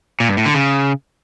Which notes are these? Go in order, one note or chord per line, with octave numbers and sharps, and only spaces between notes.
A#2
G2
A2
D3
C#3